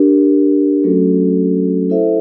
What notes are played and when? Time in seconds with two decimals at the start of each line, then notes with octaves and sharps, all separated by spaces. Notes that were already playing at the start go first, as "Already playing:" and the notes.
Already playing: D4 G4 A#4
0.83 F#3 A3 C#4 F#4 A4
1.90 E4 A4 C5 E5